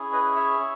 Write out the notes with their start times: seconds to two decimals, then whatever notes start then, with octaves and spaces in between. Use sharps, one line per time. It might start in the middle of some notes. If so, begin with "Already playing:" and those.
Already playing: C#4 E4 G#4
0.12 B4 D#5
0.35 C#5 E5
0.59 C#4